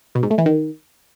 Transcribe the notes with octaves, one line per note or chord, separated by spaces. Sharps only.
B2
G#2
A3
E3
D#3